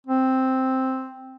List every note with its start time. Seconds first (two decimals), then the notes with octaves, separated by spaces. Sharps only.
0.07 C4